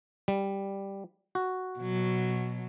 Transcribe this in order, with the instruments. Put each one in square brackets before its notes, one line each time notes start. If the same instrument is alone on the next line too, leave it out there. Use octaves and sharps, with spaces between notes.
[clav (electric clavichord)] G3
F#4
[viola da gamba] B2 F#3